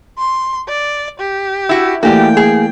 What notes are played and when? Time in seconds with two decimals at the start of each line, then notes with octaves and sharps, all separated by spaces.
0.18 C6
0.68 D5
1.20 G4
1.69 E4 F#4
2.03 E3 A3 A#3 F#4 G4 D5 G5
2.37 G#4